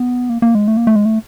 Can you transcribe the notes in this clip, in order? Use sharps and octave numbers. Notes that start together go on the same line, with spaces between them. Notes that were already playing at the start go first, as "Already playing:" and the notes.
Already playing: B3
A#3
A#3
G#3
A3
A#3
A3
G#3
A3